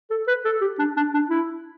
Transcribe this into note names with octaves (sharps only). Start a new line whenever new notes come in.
A4
B4
A4
G4
D4
D4
D4
E4